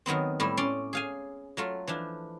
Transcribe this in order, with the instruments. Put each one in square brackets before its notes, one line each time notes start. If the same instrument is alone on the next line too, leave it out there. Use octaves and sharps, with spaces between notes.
[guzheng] D#3 F#3 B3 C4
A2 G3 E4
C#4 D5 C6
G#4 F5 G#5
F#3 A3 F4
E3 F3 D4